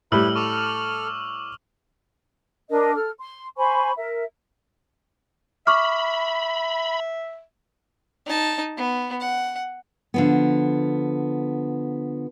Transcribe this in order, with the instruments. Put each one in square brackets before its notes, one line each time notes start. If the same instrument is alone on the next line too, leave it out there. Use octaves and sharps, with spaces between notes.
[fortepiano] A2 G3 [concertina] E4 B4 [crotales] E6 F6 F#7
[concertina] A4 F6 [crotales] C#6 D6 F7
[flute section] D4 A#4 D#5
A4 F6
C6
C5 G#5 B5 C#6
A#4 E5
[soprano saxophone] E5 [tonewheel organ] B5 [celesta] C#6 D6 F6
[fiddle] D#4 A5
B3
F#5
[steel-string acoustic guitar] D3 F3 B3